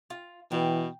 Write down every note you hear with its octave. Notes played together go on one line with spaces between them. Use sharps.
F4
B2 E3 G5